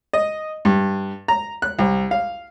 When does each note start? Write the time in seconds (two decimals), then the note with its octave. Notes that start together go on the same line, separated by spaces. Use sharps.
0.13 D#5
0.65 G2
1.28 A#5
1.62 F#6
1.79 C2
2.11 F5